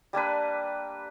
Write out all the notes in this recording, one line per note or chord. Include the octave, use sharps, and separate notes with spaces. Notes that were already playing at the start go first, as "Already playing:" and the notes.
G3 A#3 D4 B4